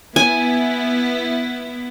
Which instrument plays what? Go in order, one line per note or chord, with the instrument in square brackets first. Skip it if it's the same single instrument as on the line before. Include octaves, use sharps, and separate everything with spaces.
[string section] B3 E4 [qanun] G#5